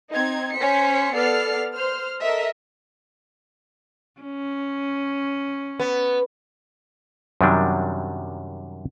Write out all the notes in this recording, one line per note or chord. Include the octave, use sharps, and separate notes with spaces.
C4 D#4 G#6
C#4 C5 B6 C#7
B3 A4 D5 F6 C7
C5 F6
A4 A#4 D#5 E5
C#4
B3
F#2 C3 D#3 F#3 G3 D4